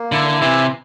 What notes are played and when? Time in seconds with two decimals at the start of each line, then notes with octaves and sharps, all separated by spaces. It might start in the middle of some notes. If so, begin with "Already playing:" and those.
Already playing: A#3
0.12 D3 E4
0.41 C3 E3